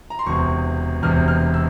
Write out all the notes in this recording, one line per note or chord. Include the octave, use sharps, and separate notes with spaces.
A#5
C6
E1 E2 C3 C#6
E1 E2 C3 F6
F6
E6